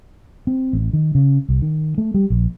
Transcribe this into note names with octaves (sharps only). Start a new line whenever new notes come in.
C4
A1
D#3
C#3
C2
D#3
A3
G3
A#1